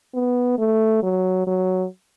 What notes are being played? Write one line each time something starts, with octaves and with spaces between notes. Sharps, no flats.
B3
A3
F#3
F#3